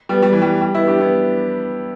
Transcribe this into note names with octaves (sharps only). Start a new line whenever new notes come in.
G3 B3
G3
E3
G3
G3
B3 E4
D4 G4
B3 E4